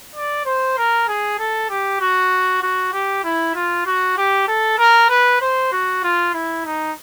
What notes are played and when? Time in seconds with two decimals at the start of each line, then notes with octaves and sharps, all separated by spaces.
0.15 D5
0.45 C5
0.77 A#4
1.08 G#4
1.39 A4
1.70 G4
2.00 F#4
2.62 F#4
2.93 G4
3.24 E4
3.55 F4
3.86 F#4
4.17 G4
4.48 A4
4.78 A#4
5.09 B4
5.41 C5
5.72 F#4
6.03 F4
6.33 E4
6.65 D#4